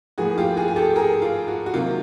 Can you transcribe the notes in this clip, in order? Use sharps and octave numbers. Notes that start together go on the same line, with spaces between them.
A2 F3 A#3 F#4 G#4
F4 G4
F#4 G#4
G#4
G4 A4
G#4 A#4
F4
F#4
F#4
C3 D#3 F#3 A#3 F4